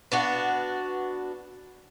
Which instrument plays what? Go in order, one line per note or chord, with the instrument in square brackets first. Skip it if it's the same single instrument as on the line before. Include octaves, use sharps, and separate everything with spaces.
[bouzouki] B3 D4 F#4